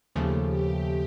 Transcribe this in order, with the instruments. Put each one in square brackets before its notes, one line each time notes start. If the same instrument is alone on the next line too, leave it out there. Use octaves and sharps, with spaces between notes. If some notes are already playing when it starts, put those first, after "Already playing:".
[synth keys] D#2 C#3 F3 A3 [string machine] G4
[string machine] G4